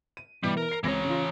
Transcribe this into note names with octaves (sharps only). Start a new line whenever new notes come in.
D#7
B2 E3 G3
A#4
C7
C#2 E3 C4 C#5 A#6
C#3 F4